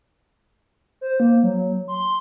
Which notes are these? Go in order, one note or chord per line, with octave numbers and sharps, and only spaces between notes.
C5
A#3
F#3
C6